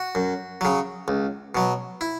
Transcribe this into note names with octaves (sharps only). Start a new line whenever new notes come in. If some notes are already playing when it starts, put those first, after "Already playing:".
Already playing: F#4
F#2
C#3 F#3
C#2
B2 F#3
E4